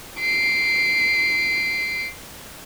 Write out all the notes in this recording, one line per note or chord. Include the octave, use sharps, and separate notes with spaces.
C7 D7